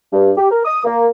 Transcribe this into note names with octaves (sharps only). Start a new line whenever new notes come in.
G2
G4
A#4
D#6
A#3